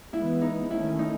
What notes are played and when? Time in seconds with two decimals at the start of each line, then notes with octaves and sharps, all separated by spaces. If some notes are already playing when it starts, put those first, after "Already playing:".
0.13 E3 G#3 B3 E4
0.42 D#4
0.70 D#3 A3 C#4 E4
0.99 D#4